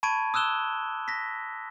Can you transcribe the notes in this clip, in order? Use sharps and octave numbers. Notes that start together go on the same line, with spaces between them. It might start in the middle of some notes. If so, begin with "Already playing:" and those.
A5 B5 C#6 G#6 D7 D#7
D#6 E6 F#6 E7 G7
A#6 B6